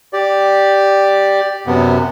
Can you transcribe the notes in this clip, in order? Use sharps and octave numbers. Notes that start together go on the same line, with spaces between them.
G4 D5
F#2 C3 B3